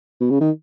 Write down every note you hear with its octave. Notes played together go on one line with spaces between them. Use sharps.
B2
C#3
D#3